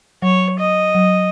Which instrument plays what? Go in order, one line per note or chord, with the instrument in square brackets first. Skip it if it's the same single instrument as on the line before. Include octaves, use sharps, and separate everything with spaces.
[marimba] F#3 [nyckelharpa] C#5
[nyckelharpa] D#5
[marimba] F#3